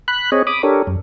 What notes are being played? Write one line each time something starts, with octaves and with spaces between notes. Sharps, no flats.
B5 F#6
C4 G#4 C#5 D#5
B5 D6 D#6
D4 G4 A4 A#4 C#5
F#2